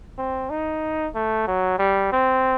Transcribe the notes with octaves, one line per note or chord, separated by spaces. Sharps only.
C4
D#4
A3
F#3
G3
C4